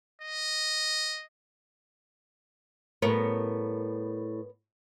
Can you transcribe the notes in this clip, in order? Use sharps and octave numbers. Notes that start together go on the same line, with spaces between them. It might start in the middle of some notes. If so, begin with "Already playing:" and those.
D#5
A2 G3 B3 A#4 C#5